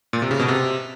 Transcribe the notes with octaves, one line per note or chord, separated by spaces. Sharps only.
A#2
C3
C#3
B2
C3